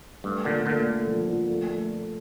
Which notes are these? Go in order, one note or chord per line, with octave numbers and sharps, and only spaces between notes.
G2 A3
A#2 D3 A3
A#2 D3 A3
A3
F3
F3
A3
A3